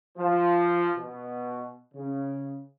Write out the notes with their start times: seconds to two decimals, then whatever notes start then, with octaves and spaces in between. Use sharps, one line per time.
0.17 F3
0.96 B2
1.94 C#3